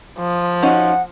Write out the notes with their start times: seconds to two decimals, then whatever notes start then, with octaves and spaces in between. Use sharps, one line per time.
0.19 F3
0.63 C#4 D#4 F#4 F#5